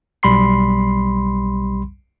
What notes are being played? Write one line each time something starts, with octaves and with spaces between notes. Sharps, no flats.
B1 G3 B5 C6 C7